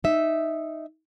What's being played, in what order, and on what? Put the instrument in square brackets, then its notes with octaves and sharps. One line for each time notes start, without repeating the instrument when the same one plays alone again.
[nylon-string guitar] D#4 E5